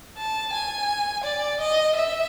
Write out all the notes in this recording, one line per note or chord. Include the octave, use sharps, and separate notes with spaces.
A5
G#5
D5
D#5
E5